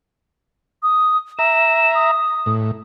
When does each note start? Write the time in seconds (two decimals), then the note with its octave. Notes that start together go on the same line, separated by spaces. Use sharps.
0.83 D#6
1.39 E5 A#5 E7
1.95 D#6
2.46 A2